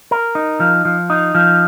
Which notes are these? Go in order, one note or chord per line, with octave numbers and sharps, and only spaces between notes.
A#4
D#4
F3
F3
D#4
F3